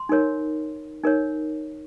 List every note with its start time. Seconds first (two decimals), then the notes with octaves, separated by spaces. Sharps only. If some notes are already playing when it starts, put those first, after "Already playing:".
Already playing: C6
0.09 D#4 A#4 C#5
1.04 D#4 A#4 C#5